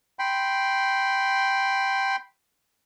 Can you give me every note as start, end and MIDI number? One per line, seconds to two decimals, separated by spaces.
0.19 2.16 79
0.19 2.16 83
0.19 2.16 84